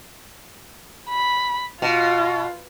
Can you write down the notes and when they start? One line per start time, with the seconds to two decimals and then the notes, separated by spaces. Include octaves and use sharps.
1.09 B5
1.82 B2 F4